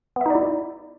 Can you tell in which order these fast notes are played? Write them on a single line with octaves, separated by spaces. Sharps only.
B3 E5 D#4 D5 E4